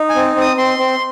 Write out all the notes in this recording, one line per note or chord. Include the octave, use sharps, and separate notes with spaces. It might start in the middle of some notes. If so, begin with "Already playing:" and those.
Already playing: D#4
G#5
C4
C4
D#6
C4 C6
C4